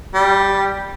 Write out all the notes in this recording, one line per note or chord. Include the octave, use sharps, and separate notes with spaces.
G3